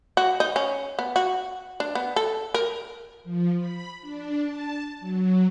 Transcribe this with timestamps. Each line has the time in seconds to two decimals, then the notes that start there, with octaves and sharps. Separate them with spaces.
0.17 F#4
0.40 D#4
0.56 C#4
0.99 B3
1.16 F#4
1.80 D4
1.95 B3
2.16 A4
2.54 A#4
3.24 F3
3.57 B5
4.01 D4
4.43 A5
5.00 F#3